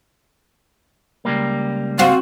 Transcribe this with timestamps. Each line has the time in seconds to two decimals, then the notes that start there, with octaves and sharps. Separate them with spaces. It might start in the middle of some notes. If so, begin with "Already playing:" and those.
1.25 C#2 G3 A#3
1.99 C4 F#4 F5